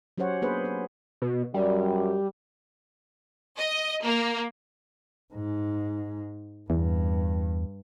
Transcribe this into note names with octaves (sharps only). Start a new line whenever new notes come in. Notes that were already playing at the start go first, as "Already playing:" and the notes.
F#3 C#4 G4 C5 C#5 F#5
A#3 B3 D4 G#4 B4 C5
B4
B2
F#2 G3
D#5
A#3
G#2
E2 G2